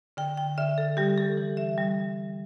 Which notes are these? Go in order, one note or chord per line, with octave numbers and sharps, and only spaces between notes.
D3 G5
G5
D3 E5
A4
G3 G4
A4
E3
E5
G3